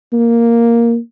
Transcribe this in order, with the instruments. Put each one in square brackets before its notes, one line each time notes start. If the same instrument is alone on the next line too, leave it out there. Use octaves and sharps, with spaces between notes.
[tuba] A#3